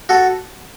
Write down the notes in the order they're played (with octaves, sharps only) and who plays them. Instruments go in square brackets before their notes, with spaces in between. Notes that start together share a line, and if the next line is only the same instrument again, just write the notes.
[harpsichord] F#4 A4